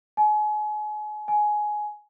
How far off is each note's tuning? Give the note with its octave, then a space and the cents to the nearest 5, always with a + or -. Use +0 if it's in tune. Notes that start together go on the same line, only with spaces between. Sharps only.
G#5 +35
G#5 +15